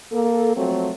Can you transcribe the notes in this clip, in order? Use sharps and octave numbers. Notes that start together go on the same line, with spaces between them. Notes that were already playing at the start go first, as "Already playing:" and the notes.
A#3 A4
F3 F#3 A3 C4